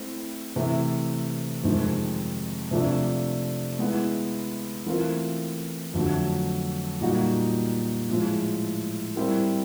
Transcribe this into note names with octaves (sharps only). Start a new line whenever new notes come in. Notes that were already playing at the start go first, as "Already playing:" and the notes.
Already playing: A3 C4 E4
C3 E3 A3
F2 C3 D#3 G#3 C4
C3 F3 A3 D4
G#3 B3 E4
E3 A3 C4 F4 A#4
F2 D3 F#3 A3
A#2 G3 A#3 D#4 F#4
A2 F3 G#3
G3 C4 E4 G4 A#4